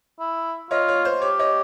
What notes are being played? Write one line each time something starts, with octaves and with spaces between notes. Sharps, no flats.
E4
F4 C#5 D#5
C#5
C5
G4 C#5
C#5 D#5